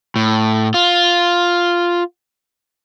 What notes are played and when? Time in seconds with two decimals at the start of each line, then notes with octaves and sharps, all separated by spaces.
0.16 A2
0.74 F4